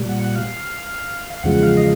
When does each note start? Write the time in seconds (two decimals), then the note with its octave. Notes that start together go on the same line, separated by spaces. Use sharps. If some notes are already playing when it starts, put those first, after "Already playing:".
Already playing: A#2 G3
0.09 F#5
0.23 F#5
0.36 F5
1.34 F5
1.43 E2 C#3 F3 G#3 F#5
1.63 F5
1.77 D#5